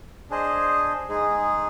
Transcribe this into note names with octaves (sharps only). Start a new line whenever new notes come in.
D4 G#4 C5 D#5
G#3 D#4 G#4